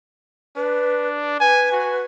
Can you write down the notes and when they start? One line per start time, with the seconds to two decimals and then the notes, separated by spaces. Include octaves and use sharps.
0.57 D4 B4
1.40 B4 G#5
1.72 F#4